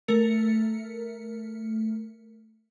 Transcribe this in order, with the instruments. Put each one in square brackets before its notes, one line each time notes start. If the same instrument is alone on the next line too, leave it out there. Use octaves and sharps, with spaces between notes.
[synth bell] A3 A#4 C#7